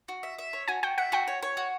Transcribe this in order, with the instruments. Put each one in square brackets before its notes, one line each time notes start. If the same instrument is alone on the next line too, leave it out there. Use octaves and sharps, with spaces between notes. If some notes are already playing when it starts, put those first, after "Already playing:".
[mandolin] F#4
E5
E5
C#5
[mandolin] F#4 [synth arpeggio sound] G#5
[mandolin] F#4 [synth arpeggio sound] G5
[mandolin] E5 [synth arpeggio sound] F#5
[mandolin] F#4 [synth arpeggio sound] G5
[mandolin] C#5
C#5
F#4